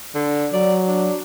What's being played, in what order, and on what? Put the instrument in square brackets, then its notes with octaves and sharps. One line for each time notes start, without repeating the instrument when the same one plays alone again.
[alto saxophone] D3
[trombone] F#3 [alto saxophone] D5
[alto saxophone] D4